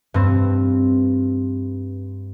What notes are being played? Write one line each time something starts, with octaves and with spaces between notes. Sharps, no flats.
G2 C4